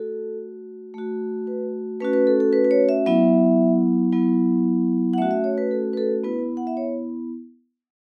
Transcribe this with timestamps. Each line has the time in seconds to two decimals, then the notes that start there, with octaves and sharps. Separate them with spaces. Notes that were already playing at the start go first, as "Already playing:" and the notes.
Already playing: A3 F#4 A4
0.94 A3 F#4
1.47 B4
2.00 A3 C#4 F#4 B4
2.13 B4
2.27 A4
2.40 A4
2.53 B4
2.64 B4
2.71 C#5
2.89 E5
3.06 F#3 B3 E4 E5
4.12 F#3 B3 E4
5.13 F#5
5.18 A3 C#4 F#4 E5
5.31 E5
5.44 C#5
5.58 B4
5.71 A4
5.93 B4
5.97 A4
6.24 B3 E4 B4
6.57 F#5
6.67 E5
6.77 C#5